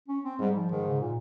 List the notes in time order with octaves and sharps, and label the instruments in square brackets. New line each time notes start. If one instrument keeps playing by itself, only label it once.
[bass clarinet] C#4
C4
[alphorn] G#2 [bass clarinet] G3
[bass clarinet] F3
[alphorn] G#2 [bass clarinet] D#3
[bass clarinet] C#3
A#2